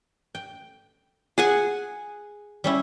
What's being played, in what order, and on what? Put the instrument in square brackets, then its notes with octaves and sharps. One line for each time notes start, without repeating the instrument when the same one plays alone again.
[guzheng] G5
[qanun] G#4 F#5 G#5
[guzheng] G3 C#4 E4